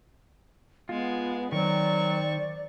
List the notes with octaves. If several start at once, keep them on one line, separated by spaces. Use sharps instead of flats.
G#3 B3 F4
D#3 F#3 C4 A#4 D5 C#6